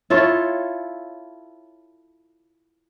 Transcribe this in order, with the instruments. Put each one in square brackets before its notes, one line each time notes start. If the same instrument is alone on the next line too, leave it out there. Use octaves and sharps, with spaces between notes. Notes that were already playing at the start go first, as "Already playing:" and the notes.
[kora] E4 F4 A4 C#5